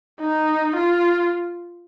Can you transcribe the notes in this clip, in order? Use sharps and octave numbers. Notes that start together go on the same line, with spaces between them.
D#4
F4